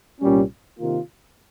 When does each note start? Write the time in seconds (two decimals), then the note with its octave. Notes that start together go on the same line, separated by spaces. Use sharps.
0.20 C2 A#2 G3 C#4
0.79 C3 D#3 A#3 F4